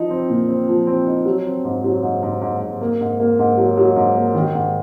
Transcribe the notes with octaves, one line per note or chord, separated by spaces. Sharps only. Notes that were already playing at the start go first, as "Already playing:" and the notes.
Already playing: F3 D#4
C4
A#2
C4
F3
C4
D#4
F#3
C4
G#2
F#3
G#2
G#2
G#2
G#2
A#3
G#2
A#3
G#2
F#3
F#3
G#2
A#3
D#3
G#2